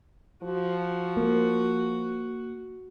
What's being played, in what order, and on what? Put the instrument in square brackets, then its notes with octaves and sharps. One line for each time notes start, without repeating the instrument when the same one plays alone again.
[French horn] F3 [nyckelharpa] F#4
[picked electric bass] A#3